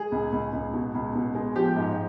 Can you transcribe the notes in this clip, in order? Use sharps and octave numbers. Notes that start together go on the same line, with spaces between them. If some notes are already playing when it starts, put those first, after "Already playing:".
Already playing: G#3 G#4
C#2
C#2
C#2
B2
C#2
B2
G#3
F3 G4
G#2